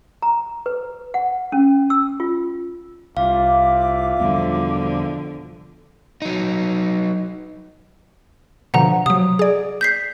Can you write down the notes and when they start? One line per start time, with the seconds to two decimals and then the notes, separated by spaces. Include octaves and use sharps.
0.22 A#5
0.66 B4
1.14 F#5
1.52 C#4
1.90 E6
2.20 F4
3.17 C2 F4 E5 F5 D6
4.19 E2 B2 D3 F3 G3 B3
6.22 F#3 D#4
8.74 B2 D3 F3 F#5 A#5
9.06 C3 F#3 D#6
9.39 G#4 D5
9.81 G6 B6 C7